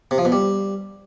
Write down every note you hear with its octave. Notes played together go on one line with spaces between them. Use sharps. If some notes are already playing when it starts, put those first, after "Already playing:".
C3
F3
B2
G3